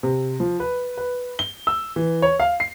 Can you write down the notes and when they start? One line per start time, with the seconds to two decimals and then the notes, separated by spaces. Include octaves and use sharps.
0.03 C3
0.40 F3
0.60 B4
0.98 B4
1.39 G7
1.67 E6
1.96 E3
2.22 C#5
2.40 F5
2.60 C7